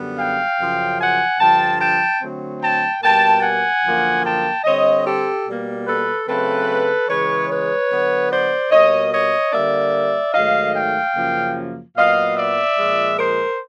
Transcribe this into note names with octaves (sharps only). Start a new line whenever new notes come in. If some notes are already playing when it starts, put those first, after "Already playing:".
Already playing: F#2 D3 G3 B3
F5 G5
F#2 C#3 F3
F#5 G#5
G2 D3 F3 G5 A5
G5 A5
D3 F#3 A3 C4
G5 A5
B2 G3 A#3 G5 A5
F#5 G#5
F#2 D3 F3 A#3
G5 A5
D3 G3 C4 C#5 D#5
G4 A4
B2 G3 A#3
A4 B4
C#3 F#3 A3 C4 A4 B4
C#3 E3 G#3 B4 C#5
B4 C#5
D3 F#3 B3
C5 D5
B2 G3 A#3 C#5 D#5
C#5 D#5
D3 G3 A#3 D5 E5
G#2 D#3 F#3 A3 D#5 F5
F5 G5
F#2 C#3 F3 A#3
A#2 F#3 B3 D#5 F5
D5 E5
A#2 F3 G#3
A#4 C5